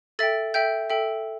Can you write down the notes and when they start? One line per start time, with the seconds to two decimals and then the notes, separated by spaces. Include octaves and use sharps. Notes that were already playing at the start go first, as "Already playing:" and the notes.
0.19 A4 E5 G5 A6
0.54 A4 E5 G5 G6
0.90 A4 E5 G5